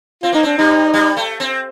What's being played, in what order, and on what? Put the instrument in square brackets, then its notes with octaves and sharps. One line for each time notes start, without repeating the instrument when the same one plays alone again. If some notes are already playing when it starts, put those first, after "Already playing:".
[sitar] C4 [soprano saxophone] F4
[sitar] A#3 [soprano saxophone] D#4
[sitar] C4 [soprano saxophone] D4
[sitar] G3 [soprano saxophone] D#4
[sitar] G3
A3
C4